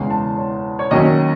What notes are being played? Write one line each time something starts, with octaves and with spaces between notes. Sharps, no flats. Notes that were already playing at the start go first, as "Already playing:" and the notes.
Already playing: E2 C#3 G#3 C#4 C6
A5
C#5
C#5
D#2 D#3 F#3 C#4 D#5